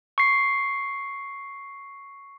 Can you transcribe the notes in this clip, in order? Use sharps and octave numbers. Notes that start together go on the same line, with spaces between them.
C#6 C7